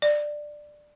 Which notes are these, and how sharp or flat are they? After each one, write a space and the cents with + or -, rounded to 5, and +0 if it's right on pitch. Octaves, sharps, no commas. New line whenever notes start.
D5 +15